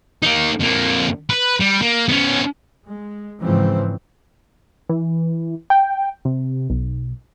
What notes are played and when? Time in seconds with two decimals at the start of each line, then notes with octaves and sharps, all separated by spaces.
0.23 A#3 D#4
0.60 F2 A#3
1.29 B4
1.60 G3
1.82 A#3
2.08 B3 C#4
2.85 G#3
3.41 G#2 C#3 E3 F3 C4
4.89 E3
5.70 G5
6.25 C3
6.70 B1